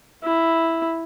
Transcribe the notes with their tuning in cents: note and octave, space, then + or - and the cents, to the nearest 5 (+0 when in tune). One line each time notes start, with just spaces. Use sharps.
E4 +0